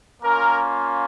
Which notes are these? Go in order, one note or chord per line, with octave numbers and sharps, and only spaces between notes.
A#3 C#4 F4 A#4